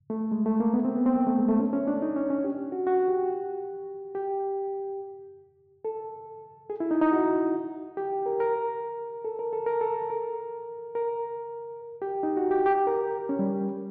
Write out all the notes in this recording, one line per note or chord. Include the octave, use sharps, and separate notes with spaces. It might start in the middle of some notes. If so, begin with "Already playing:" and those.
A3
G#3
A3
A#3
B3
C4
B3
C4
A#3
A3
G#3
A3
C#4
C#4
D4
D#4
C#4
C#4
G4
F#4
F#4
G4
G4
A4
G#4
E4
D#4
D#4
F#4
G4
A#4
A#4
A4
A#4
A4
A#4
A4
A#4
A#4
G4
D#4
F#4
G4
G4
A#4
C#4
G3